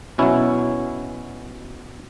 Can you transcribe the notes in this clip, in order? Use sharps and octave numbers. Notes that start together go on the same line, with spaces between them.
B2 F#3 C#4 E4